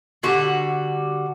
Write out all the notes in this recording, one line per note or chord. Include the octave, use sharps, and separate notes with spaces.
D3 G3 F#4